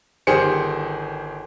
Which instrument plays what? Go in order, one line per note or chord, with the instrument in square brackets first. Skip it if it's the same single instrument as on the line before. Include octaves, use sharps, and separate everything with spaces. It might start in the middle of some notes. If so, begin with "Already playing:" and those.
[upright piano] G1 D#3 G4 G#4 C5 C#7